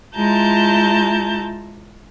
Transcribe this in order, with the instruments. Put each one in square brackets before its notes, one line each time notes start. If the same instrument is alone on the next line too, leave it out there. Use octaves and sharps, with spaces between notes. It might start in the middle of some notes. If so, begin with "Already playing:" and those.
[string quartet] G#3 E4 F4 A5 A#5 G6